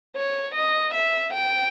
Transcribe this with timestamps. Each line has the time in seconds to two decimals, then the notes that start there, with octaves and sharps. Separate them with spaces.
0.16 C#5
0.55 D#5
0.94 E5
1.34 G5